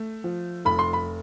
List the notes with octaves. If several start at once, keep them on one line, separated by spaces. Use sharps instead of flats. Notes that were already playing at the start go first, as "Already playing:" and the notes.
Already playing: A3
F3
F1 B5
C6
B5